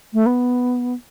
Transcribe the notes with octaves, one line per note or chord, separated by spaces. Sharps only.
A3
B3